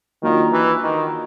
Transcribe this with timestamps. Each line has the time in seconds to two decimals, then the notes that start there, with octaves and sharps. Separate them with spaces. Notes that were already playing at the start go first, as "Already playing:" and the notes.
0.23 D#3 F#3 A#3 D4 F4
0.52 E3
0.83 D#3